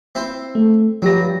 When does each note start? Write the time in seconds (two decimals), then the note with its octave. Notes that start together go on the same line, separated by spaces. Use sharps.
0.15 C4 E4 C5
0.55 A3
1.02 G2 F3 F#3 G4 A#6